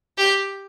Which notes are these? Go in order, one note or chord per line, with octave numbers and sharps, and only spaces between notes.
G4